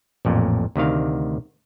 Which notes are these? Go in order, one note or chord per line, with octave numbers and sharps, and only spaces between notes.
A1 F2 A#2
D2 C3 D#3 F5